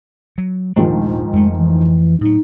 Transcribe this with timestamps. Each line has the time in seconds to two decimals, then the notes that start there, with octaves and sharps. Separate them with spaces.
0.38 F#3
0.76 D#1 G#2 D#3 F3 A3 D4
1.33 F2 G#3 A3
1.56 E3
2.21 A2 F#3 D#4